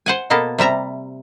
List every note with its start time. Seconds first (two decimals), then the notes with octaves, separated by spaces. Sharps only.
0.06 C5 F#5 G#5
0.30 B2 A#3 B3 A4
0.58 C3 G3 E5 A#5